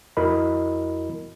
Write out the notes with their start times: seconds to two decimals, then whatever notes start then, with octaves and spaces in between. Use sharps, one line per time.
0.17 F2 E4 F#4 A#4 D#5 B5